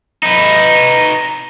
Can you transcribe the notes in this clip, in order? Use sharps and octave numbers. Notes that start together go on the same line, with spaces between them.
D#4 B4